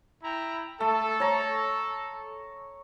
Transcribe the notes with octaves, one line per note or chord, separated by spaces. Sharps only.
E4 G5 A#5
A3 A4
C#5 A#5